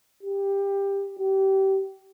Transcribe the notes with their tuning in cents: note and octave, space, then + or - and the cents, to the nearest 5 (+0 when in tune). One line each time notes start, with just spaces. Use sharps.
G4 +15
G4 -25